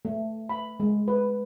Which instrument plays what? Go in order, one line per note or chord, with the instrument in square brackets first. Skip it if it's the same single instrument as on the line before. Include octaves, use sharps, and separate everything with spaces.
[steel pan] A3
B5
G#3
B4